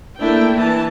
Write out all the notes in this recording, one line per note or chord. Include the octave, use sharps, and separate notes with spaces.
A3 A#3 D4 E4 G5
E3 A5